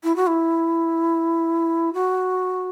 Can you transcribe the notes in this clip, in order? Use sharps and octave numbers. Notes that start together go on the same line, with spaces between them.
E4
F#4
E4
F#4